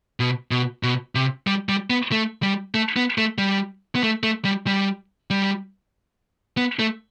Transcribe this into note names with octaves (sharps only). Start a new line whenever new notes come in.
B2
B2
B2
C3
G3
G3
B3
A3
G3
A3
B3
A3
G3
B3
A3
A3
G3
G3
G3
B3
A3